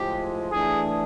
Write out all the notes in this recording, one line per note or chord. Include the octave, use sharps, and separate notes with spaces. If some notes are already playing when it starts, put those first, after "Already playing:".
Already playing: A2 F3 G#3 G4
E3 A3 D4 G#4